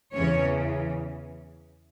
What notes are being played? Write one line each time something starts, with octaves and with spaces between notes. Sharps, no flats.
E2 C#3 E3 C#4 C#5